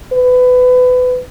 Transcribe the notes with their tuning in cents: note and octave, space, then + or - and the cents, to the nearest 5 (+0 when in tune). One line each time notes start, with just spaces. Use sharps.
B4 +25